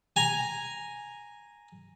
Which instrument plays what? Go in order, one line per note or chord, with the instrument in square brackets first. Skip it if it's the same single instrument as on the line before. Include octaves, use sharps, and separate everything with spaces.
[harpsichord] G#5 A#5